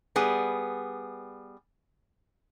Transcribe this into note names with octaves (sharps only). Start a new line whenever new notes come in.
G3 B3 G#4